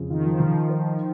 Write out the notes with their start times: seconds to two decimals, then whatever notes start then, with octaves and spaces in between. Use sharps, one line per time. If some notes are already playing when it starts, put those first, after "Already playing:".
Already playing: F2 C#3
0.10 D#3 F4
0.25 F3
0.40 D#3 F3
0.69 C5